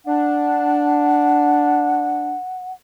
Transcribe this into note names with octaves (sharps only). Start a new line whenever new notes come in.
D4 F#5